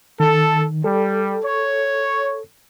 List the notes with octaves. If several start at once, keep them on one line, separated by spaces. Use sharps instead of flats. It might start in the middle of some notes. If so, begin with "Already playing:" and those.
D#3 A4
G3 A4
C#5